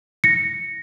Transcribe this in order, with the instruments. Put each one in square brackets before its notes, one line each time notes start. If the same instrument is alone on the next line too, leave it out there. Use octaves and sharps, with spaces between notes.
[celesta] A#6 C#7